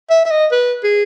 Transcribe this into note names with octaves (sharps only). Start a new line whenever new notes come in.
E5
E5
D#5
B4
G#4